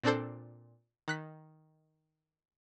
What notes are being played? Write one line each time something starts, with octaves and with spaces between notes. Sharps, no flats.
A#2 C4 D4 A4 C5
D#3 F#6 B6